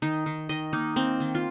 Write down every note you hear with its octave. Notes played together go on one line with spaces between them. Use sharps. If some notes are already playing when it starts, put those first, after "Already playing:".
D#3 D#4
D#3
D#3 D#5
A#3 D#4
A#3 C4
D#3
F4